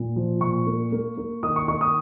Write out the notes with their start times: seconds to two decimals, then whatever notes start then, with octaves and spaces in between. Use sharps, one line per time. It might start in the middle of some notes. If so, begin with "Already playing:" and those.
Already playing: A#2
0.16 F3
0.41 A#2 C#6
0.67 A#3
0.92 A#3
1.18 A#3
1.43 D#3 D#6
1.56 C#6
1.68 D#3 C#6
1.81 D#6